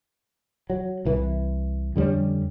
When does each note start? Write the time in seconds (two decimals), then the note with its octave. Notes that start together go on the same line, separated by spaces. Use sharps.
0.70 F#3
1.05 C2 E3
1.96 F2 D3 G3 C#4